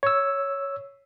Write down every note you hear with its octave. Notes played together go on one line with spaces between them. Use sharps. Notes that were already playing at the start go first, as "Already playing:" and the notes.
C#5 E6